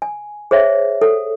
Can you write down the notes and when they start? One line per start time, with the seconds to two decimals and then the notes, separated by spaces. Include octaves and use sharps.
0.02 G#5
0.51 G#4 C5 C#5 E5 F#5
1.02 A4 F#5